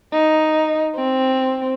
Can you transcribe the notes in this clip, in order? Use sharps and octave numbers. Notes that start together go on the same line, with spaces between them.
D#4
C4